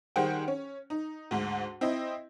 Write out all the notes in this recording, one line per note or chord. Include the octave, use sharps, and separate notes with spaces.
D#3 G3 G#4 C5 F#5 G5
C#4
D#4
D2 G#2
C4 E4 D#5